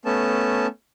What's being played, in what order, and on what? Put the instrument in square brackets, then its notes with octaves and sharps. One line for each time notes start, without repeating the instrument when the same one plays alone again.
[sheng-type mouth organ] A3 B3 C#4 A5